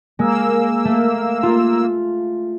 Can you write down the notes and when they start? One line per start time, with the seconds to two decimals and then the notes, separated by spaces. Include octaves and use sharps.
0.19 G#3 A#3 E6
0.85 A3
1.43 F4